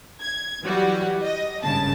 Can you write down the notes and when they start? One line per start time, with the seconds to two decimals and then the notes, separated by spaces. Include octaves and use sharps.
0.21 G#6
0.64 E3 F#3 G3 F#4
1.23 D#5
1.63 G#1 G2 C#3 A5